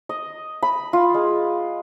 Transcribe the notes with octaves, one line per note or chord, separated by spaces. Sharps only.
D#5
B5
F4
G#3